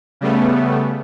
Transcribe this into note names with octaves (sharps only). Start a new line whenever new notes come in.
C#3 G3 A3 B3